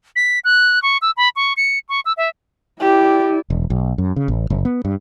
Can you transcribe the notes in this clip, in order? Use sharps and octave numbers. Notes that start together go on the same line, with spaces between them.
B6
F#6
C#6
E6
B5
C#6
C#7
C#6
E6
E5
E4 G4 D5
E1
B1
F#2
C#3
A1
F#1
B3
G2